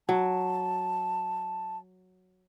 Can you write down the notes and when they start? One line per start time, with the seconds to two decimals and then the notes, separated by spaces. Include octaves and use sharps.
0.09 F#3 A5